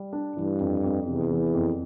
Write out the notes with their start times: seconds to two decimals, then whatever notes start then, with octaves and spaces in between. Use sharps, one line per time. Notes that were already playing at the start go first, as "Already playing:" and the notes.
Already playing: G3
0.13 D4
0.37 G2 E3
0.60 F2
0.84 F2
1.07 E2 C3
1.31 E3
1.54 F2